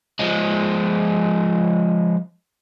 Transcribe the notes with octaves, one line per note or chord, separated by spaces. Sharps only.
F3 G#3